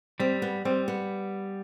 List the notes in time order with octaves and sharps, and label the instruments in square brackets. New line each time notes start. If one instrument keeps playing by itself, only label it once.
[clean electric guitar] G3 [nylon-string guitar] C4
[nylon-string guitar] B3
[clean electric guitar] G3 [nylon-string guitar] C4
[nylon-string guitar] B3